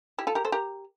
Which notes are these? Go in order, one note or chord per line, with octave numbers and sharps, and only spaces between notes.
E4 G4
F4 A4
G4 A#4
A4 C5
G4 A#4